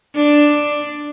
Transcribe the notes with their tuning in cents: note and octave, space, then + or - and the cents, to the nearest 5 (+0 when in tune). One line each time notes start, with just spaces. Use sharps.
D4 +5